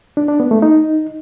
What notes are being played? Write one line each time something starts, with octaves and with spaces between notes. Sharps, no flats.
D4
D4
B3
A3
D#4